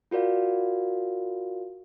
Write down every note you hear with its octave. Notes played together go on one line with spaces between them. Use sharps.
F4 F#4 A#4 D5 F5